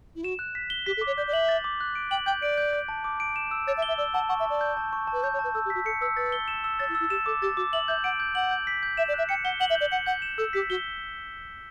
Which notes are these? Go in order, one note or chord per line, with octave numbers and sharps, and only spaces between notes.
E4
F#4 E7
F#6
B6
G7
G4 B6
A4
D6
C#5
D5 G6
D5
E5 F#7
A6
D6
F#6
D7
G5 F#7
G5 G6
D5 D7
G6
G6
A5
D6
D7
E7
E6
C#5 A6
E5
G7
E5
D5 E6
F#5 A5
F#5 C#6
E5
D5 A5
G6
A5
C#6
A5
B4
C#5 G6
C#5
A5
B4
A4 E6
G4
F#4 B6
A4 C#7
B4 E6
B4 A6
G7
E7
E6
C#5 A6
E4
E6
E4
G4 E7
A4 D6
G4 A6
F#4 D6
E5 F#7
E5 G6
F#5 D7
G6
F#5 F#7
G6
B6
G6
E5 E7
D5
E5 F#6
G5 C#7
F#5 G7
F#5 F#7
E5
G6
D5
F#5 C#7
F#5 G6
E7
A4 E6
G4 B6
F#4 G7